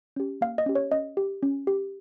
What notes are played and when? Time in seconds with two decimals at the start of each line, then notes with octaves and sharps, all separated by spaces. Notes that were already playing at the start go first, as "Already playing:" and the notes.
0.16 C#4 G4
0.41 A#3 F5
0.58 D#5
0.66 C#4 G4
0.75 C#5
0.91 C#4 D#5
1.17 G4
1.43 C#4
1.67 G4